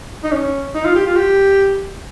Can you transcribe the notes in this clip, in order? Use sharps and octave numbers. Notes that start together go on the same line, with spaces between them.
D#4
C#4
D#4
F4
G4
F4
G4